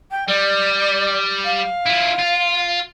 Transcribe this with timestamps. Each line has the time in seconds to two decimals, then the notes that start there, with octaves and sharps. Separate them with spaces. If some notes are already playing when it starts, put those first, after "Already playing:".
0.11 G5
0.28 G3 D5
1.45 F5
1.86 E4 F4
2.19 F4